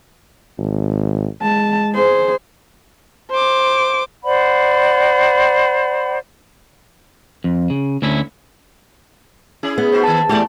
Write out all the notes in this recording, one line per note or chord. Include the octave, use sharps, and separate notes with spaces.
G#1
G#3 A5
G#4 C5
C5 D6
C5 D5 F#5 B5
F2
C#3
D2 C#4 E4
C#4 E4 G#4
B3
D#4 F#4 C5
D#3 G#3 A5
E2 G#3 A3 G4 D5